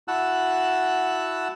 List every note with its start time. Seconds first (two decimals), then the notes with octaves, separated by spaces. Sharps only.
0.08 E4 F#4 F#5 A5 E6 F#6